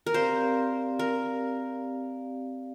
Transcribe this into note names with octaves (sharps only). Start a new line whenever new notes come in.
A#4
C4 G4 C5 D5 F5
A#4